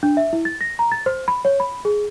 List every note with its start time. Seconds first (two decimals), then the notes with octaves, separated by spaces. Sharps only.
0.03 D4
0.17 E5
0.33 E4
0.45 A6
0.61 A#6
0.79 A#5
0.92 A6
1.06 C5
1.28 B5
1.45 C#5
1.60 B5
1.85 G#4